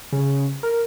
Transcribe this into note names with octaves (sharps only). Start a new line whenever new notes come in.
C#3
A#4